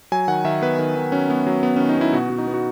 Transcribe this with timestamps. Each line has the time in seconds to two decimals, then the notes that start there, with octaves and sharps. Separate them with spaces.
0.12 F#3 G#5
0.28 D#3 F#5
0.45 D#3 E5
0.62 B3 B4
0.79 D#3
0.96 D#3
1.12 F#3 C#4
1.30 F#3 B3
1.47 F#3
1.63 B3
1.76 D#3 C#4
1.89 D#4
1.97 B3 E4
2.13 B2 F#4
2.30 B2
2.38 D#4
2.47 B3
2.54 F#4